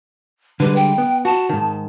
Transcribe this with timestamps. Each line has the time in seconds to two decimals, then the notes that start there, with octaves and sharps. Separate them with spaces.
0.60 D3 G3 G#3 B4
0.76 G5
0.98 B3
1.25 F#4 A5
1.49 G#2 D#3